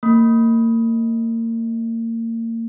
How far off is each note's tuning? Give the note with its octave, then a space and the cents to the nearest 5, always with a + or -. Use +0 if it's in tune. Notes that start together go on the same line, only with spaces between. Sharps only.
A#3 -35